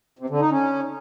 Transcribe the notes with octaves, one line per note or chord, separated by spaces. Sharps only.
C3
D3
D#4
C#4